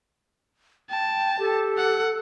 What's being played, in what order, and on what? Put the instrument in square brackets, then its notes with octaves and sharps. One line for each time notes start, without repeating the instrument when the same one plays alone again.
[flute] G5 [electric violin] A5
[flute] G4 [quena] A4
[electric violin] F#5